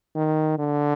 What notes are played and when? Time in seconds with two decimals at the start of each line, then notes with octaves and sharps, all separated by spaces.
0.15 D#3
0.59 D3